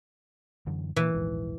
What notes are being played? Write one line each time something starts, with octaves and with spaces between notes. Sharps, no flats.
F#2 D3 E3
A#2 E3 A#3
D#1 A#1 G#2